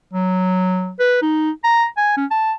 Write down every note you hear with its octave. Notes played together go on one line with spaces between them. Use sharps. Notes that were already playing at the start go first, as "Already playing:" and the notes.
F#3
B4
D#4
A#5
G#5
C#4
A5